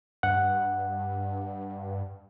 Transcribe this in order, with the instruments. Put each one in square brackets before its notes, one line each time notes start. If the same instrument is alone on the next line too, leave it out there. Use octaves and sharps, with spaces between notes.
[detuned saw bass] G2 [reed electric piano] F#5